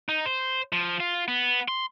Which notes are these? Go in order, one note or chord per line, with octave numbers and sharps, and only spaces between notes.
D#4
C5
F3
F4
B3
C6